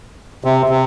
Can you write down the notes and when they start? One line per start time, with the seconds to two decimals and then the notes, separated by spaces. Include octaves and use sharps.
0.44 C3
0.69 C3